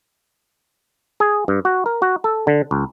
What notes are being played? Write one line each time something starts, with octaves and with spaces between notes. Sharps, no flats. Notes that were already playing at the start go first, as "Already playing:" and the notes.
G#4
G2
F#4
A#4
F#4
A4
D3
C#2